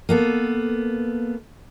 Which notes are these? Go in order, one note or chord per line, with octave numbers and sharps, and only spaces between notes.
A#3 B3 A4